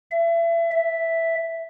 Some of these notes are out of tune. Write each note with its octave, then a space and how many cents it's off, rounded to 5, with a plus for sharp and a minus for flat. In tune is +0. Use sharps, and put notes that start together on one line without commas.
E5 +30
E5 +0